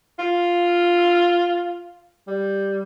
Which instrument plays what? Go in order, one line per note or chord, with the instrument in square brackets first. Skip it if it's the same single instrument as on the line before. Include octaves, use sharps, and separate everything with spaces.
[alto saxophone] F4
G3